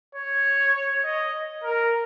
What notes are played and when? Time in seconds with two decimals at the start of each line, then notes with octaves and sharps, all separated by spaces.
0.15 C#5
1.05 D#5
1.64 A#4